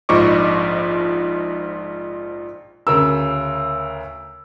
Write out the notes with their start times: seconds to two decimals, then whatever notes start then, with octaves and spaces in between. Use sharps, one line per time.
0.09 A#1 G#2 F3 D#5 C#6 D6
2.87 D2 C#3 A#4 E6